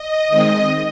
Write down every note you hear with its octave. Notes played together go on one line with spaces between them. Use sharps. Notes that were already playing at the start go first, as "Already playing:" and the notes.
Already playing: D#5
D#3 G#3 C4